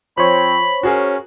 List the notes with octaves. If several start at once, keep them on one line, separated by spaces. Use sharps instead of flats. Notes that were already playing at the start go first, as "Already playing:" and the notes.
F3 C4 C5 C#5 B5
C#4 F#4 G#4 A#4